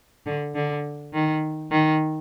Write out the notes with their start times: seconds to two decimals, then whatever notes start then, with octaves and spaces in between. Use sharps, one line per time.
0.26 D3
0.55 D3
1.13 D#3
1.71 D#3